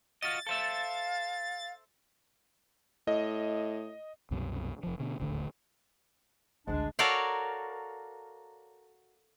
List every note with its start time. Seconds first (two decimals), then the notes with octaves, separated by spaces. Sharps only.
0.22 F4 F#4 D#5 A6
0.47 A4 C5 E5 F5
3.07 A2 D#5
4.31 C2 F#2 B2 F#3
4.83 F1 F3
4.99 B2 D3
5.20 D#1 A1 D2 D3
6.68 A1 D2 G#3 D4
6.99 F#4 A4 A#4 C#5 D5 F5